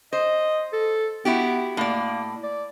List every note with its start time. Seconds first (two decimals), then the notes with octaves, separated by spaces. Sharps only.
0.13 C5 D#5
0.73 A4
1.25 B3 E4 F#4 G4
1.77 A2 A#3 D5
2.43 D5